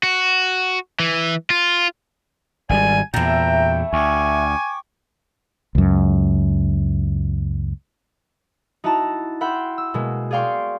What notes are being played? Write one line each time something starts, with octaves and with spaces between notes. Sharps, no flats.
F#4
E3
F4
G#1 C#3 G3 D5 G#5
E2 A#2 A3 E4 G5 A#5
D2 G5 G#5 C#6 D6
C#2 F#2
D#4 E4 F#4 E5 A5 A#5
E5 F#5 G5 B5 C6 G6
E6
B2 G#3 A#3
G#4 D5 F5 G5 C6 C#6